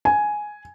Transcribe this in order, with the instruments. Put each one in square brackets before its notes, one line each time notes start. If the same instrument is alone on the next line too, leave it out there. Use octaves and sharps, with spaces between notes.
[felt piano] G#5